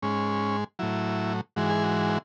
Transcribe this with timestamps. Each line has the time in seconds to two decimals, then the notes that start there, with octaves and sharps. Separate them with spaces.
0.02 G#2 G#3 C#4
0.79 A2 F#3 E4
1.56 G#2 E3 G#3 F#4
1.70 G#4
1.83 F#4